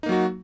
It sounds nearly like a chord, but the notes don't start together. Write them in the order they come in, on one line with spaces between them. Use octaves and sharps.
D#4 A#3 F#3 F#4